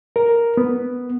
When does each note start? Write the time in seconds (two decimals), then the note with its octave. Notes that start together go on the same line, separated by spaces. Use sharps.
0.16 A#4
0.57 B3